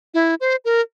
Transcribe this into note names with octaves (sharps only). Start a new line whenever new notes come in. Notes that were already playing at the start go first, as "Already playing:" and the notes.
E4
C5
A#4